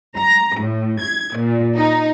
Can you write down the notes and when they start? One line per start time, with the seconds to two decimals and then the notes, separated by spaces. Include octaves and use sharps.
0.17 A#5
0.57 A2
1.00 G#6
1.36 A#2
1.77 D#4